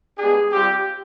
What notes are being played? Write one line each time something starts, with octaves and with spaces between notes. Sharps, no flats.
G#3 B3 D4 G4 G#4
G3 C4 F4 G4